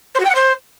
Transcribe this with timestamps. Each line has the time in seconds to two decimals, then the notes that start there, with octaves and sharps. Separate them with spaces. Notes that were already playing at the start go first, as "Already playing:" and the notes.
0.14 C5
0.19 F#4
0.24 G5
0.29 F#5
0.34 C5